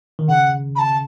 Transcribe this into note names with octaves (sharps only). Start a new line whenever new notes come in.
D#3
C#3 F#5
B5
A5